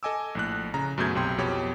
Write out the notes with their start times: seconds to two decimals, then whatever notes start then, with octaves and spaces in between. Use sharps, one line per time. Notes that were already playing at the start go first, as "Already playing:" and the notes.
0.03 A4 D#5 G#5 D6 E6
0.35 A#1 A2 F#6
0.74 C#3 A#5
0.98 F#2 B2 A3 G#4 G6 G#6
1.15 B1 C3 G5 C6
1.38 F2 B2 G4 C#5